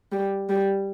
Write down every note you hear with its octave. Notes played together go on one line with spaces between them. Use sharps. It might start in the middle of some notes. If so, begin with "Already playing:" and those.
G3
G3